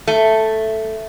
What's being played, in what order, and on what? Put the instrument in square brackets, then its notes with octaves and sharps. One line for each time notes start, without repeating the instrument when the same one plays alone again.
[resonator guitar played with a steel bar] A3